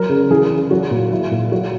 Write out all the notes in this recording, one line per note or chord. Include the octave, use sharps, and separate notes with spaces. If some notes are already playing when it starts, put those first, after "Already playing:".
Already playing: F#3 A#4
C#3
E3 G#4
C#3
F#3 F#4
A#2
F#3 E4
A#2
F#3 F#4